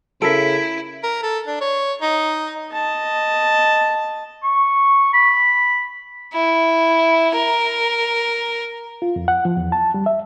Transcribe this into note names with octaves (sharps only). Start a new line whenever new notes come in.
C#3 E4 A4 A#4 B6 D7
A#4
A4
D4
C#5
D#4
D#5 A5
C#6
B5
E4
A#4
F4
F2
F#5
F3
E2
A5
G3
E5